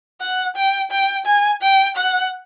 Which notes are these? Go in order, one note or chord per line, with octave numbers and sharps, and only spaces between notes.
F#5
G5
G5
G#5
G5
F#5